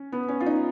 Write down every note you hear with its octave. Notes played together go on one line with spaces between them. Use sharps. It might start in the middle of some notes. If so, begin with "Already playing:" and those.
Already playing: C#4
B3
C#4
F4
D#4